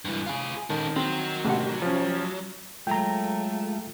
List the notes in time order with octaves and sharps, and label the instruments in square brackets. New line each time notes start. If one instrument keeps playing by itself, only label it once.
[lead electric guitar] G2 E3
F4 G#4
[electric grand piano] D#3 [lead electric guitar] C#4 A4
[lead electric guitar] F#3 [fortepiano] C4
[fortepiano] A1 C3 F#5
[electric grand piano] F3 C#4
[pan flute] F#3 [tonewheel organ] G#3 F4 [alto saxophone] A3 [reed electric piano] G5 A#5